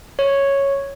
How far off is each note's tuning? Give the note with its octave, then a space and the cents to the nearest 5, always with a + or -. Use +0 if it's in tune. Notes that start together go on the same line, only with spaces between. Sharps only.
C#5 -5